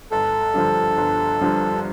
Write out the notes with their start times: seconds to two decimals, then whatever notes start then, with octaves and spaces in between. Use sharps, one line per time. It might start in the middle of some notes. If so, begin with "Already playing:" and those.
0.11 G1 A4
0.54 G2 D3 F3
0.97 G1
1.41 G2 D3 F3